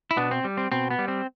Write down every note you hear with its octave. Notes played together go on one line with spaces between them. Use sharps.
E4
B2 B3 D4
C4
G3
C4
B2 C4
B3
G3
C4